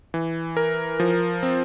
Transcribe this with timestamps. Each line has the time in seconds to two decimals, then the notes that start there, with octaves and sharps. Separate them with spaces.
0.14 E3
0.57 A#4
1.00 F3
1.43 C4